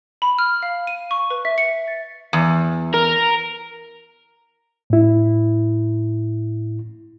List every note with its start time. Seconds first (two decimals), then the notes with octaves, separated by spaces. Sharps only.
0.22 B5
0.39 F6
0.63 F5
0.87 D#7
1.11 C#6
1.30 B4
1.45 E5
1.58 C#7
1.88 A6
2.33 E2
2.94 A#4
4.90 A2 E4